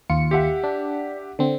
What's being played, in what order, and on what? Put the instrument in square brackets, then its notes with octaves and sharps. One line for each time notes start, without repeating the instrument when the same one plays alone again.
[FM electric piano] D#2 F4 C#7
[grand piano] G4 E5 F#5
[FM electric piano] D4
D3 C4